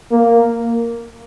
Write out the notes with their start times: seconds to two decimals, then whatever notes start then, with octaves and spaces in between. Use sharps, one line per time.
0.11 A#3